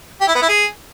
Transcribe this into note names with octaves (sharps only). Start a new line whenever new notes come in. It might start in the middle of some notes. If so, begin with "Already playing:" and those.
G4
E4
B3
E4
G#4